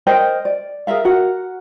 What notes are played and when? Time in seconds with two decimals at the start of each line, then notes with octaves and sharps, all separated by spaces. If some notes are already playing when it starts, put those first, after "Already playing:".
0.07 A#4 C5 D#5 G5
0.45 D5
0.87 G#4 A#4 E5 F5
1.05 F#4 A#4 F#5